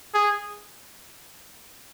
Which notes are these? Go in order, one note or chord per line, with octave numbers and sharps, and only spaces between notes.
G#4